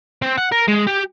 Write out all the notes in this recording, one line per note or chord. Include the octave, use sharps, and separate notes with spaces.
C4
F#5
A#4
G#3
G4